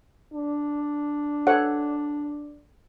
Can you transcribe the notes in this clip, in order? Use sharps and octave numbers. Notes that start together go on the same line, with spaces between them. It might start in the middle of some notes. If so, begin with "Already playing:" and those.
D4
A4 C#5 F#5